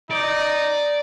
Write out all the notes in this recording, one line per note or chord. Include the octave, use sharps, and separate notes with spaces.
D#4 D5